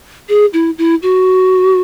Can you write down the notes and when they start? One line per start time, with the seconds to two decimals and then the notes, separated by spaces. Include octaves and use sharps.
0.29 G#4
0.53 E4
0.78 E4
1.02 F#4